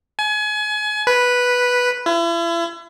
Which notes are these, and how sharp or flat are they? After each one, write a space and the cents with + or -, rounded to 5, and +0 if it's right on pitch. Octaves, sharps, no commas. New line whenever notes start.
G#5 +30
B4 -5
E4 +40